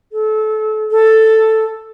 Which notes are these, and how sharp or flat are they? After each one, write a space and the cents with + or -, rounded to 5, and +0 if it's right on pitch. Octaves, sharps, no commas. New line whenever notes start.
A4 -25
A4 +5